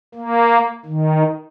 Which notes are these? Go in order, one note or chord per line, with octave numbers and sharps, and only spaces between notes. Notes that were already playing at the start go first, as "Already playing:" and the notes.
A#3
D#3